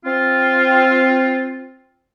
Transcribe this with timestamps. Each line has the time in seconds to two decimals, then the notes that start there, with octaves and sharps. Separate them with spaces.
0.05 C4 F4